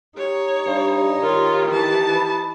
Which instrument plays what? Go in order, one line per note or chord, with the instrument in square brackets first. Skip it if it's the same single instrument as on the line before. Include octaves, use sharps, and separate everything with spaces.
[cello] D#4 [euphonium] G4 [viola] C#5
[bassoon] G2
[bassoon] D#3 [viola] F4 C#5
[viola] E3 A5
[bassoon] B4